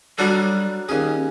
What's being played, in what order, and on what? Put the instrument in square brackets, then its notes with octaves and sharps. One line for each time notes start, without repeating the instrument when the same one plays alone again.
[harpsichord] F#3 D4 A4 [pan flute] G3
[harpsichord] D#2 G#4 [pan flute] C#4